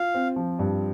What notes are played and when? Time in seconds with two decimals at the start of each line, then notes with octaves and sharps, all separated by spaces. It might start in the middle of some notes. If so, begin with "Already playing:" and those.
Already playing: F4 F5
0.14 C4
0.36 F3
0.59 G2